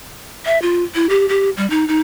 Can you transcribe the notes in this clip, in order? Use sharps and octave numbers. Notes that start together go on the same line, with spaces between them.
E5
F4
E4
G4
G4
G3
D#4
D#4